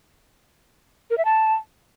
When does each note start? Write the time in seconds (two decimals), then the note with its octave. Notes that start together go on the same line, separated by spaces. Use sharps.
1.10 A#4
1.18 E5
1.25 A5